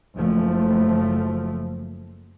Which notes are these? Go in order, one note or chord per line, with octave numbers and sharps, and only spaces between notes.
F#1 F3 A3